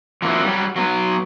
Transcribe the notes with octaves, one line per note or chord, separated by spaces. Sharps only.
F3 A#3 E4 F#4
F#3 G3
F#3 B3